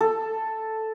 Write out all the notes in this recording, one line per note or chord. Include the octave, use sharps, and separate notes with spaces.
A4